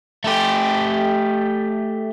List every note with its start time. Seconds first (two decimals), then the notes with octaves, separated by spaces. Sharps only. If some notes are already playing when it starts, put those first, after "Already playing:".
0.24 A3 G4